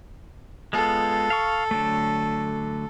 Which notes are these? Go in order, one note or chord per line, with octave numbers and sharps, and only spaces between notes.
G#3 B3 F4 A4
F5 C#6
D3 F#3 A3